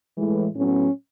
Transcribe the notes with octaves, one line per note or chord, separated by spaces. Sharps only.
A2 E3 G#3
A2 F#3 B3 C#4